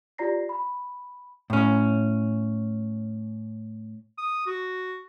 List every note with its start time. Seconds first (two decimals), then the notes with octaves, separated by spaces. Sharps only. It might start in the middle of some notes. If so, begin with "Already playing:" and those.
0.18 F4 G4 D5 A#5 A#6 C7
0.49 B5
1.50 A2 C#4
4.18 D#6
4.46 F#4